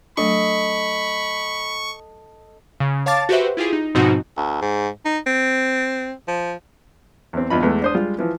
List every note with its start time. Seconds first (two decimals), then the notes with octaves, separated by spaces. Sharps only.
0.17 F#3 A3 D4 A4 D#5 B5 C#6
2.80 C#3
3.06 C#5 F5 A5 D6 A6
3.29 F#4 G4 B4 C5 E5
3.57 E4 F4 G4 G#4
3.73 D#4
3.95 G#2 B2 F3 C4 D#4 F#4
4.37 D2
4.62 G#2
5.05 D#4
5.27 C4
6.28 F3
7.33 E2 C4
7.50 E2 G2 F4 D#5 B5
7.63 E2 G#3 A3
7.82 D4 C5 D#6
7.95 G3 G#3 F4
8.18 E3 F3